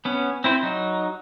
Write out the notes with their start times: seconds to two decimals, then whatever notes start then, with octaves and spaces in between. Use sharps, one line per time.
0.05 B3 C#4
0.44 C4 E4 C5
0.63 F#3 D#4